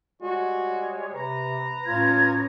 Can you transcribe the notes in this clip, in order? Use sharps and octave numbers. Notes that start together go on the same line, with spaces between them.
G3 G#3 F#4 C#5
C3 B4 A#5
A2 C#4 F4 G#6